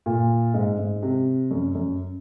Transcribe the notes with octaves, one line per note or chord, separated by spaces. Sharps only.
A#2
G#2
G#2
C3
F#2
F#2